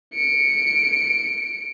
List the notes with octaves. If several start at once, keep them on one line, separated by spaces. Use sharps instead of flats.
C#7 D7